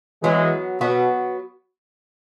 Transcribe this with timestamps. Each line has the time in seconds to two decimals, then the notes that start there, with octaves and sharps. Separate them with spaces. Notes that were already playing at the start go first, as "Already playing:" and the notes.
0.23 E3 F#3 G#3 B3 F#4
0.81 B2 F#3 B3 F#4